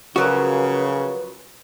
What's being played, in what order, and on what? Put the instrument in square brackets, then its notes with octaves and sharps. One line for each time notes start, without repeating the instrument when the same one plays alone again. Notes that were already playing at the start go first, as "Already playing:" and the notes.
[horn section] C#3 [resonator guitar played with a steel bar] F3 F#3 A#4 [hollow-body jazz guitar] F#4 [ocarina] B4